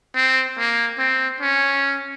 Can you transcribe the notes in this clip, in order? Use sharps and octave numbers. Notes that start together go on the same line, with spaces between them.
C4
A#3
C4
C#4